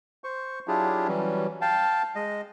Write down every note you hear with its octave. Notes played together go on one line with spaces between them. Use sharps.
C5 C#6
F#3 D4 E4 F4 G4 G#4
E3 F#3 G3 C#4
F5 G5 A5
G#3 D#5